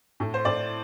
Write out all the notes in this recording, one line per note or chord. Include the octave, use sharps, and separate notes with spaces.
A2
C5
A2 D5